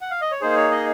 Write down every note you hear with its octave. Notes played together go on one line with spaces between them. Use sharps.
F#5
F5
D#5
C#5
A#3 D#4 G#4 C5
C#5
D#5